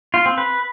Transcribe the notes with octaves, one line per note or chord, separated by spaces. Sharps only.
F4
C4
B4